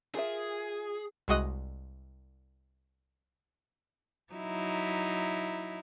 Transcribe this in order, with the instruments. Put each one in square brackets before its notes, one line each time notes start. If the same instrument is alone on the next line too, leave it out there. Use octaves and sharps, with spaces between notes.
[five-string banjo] F4 A#4 E5 [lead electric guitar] G#4
[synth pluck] C2 G#3 F#4 D#5 D#6 F#6
[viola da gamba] F#3 D#4 E4